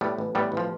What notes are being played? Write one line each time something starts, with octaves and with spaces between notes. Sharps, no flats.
A2 G3 B3
A1
A2 G3 B3
A1
F3